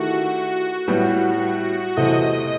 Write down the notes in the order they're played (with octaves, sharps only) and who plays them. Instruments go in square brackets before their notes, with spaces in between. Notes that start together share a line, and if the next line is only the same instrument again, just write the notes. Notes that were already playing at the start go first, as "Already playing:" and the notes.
Already playing: [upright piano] D#3 A3 E4 G4 [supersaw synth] F#4
[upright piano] A2 G3 B3
[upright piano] E2 C3 E3 A3 C4 [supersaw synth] D#5